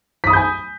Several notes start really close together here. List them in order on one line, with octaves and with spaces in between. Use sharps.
B6 D#6 B5 G6 G#5